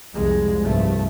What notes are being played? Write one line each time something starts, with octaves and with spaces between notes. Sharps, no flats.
C2 F2 G#3
F1 C2 G2 A3